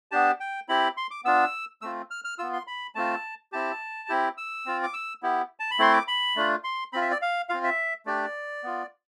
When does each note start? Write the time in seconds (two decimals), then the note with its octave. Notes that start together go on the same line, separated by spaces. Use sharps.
0.11 B3 D4 G4 A5
0.40 G5
0.69 C4 E4 G4 B5
0.97 C6
1.11 D6
1.25 B3 D4 F4 E6
1.82 A3 C4 F4 E6
2.11 F6
2.24 F6
2.38 B3 F4 E6
2.53 C6
2.67 B5
2.95 A3 C4 F4 A5
3.52 C4 E4 G4 A5
4.09 C4 E4 G4
4.38 E6
4.66 C4 F4
4.83 D6
4.94 E6
5.23 B3 E4 G4
5.60 A5
5.71 B5
5.79 A3 C4 E4 C6
5.93 D6
6.08 B5
6.36 A3 D4 F4
6.64 C6
6.93 C4 F4 B5
7.02 E5
7.11 D5
7.22 F5
7.49 C4 F4 F5
7.64 E5
8.06 A3 D4 G4 D5
8.63 B3 F4